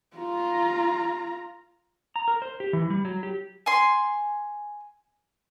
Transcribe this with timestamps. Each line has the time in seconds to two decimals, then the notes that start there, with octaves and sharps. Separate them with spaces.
0.17 F4 A#5
2.16 A#5
2.28 A#4
2.42 C5
2.60 G4
2.73 E3
2.90 G3
3.05 F#3
3.23 G4
3.66 G#5 C6